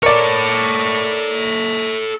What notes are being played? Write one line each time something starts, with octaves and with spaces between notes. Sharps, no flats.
A4 A#4 C#5 D5